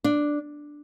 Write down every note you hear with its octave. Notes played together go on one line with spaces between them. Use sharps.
D4